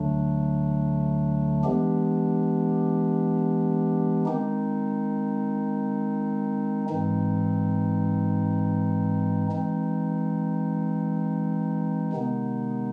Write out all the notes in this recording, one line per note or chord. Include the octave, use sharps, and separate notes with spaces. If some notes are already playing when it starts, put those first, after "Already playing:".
Already playing: D2 D3 F#3 A3 D4
E3 G#3 B3 D4 G4
D#3 G#3 C4 D#4
G#2 E3 G#3 C4 D#4
E3 G#3 C4 D#4
C3 D#3 G#3 B3 D#4